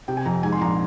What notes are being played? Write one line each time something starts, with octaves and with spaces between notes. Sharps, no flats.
C3 G5
G#5
F2 A#5
G#2 G#5
C6
A#1 A#5